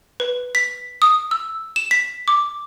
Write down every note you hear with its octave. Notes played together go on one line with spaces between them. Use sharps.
B4
B6
D#6
E6
E7
B6
D6